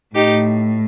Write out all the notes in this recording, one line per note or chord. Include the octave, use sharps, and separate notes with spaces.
A2 D#4 G4